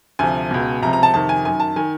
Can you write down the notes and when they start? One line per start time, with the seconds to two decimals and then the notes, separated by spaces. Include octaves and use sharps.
0.19 D2 C3 F3 G#5
0.51 C#2 B2
0.82 C#2 C3 F3 A#5
0.93 A#5
1.03 A5
1.13 F2 C3 D#3 A5
1.29 G#5
1.45 F#2 D#3 G#5
1.60 A5
1.76 D#3 G#5